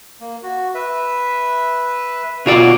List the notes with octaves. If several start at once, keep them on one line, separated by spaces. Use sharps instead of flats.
A#3
F#4
B4 E5
B2 D#3 F#3 F4 D5 C#6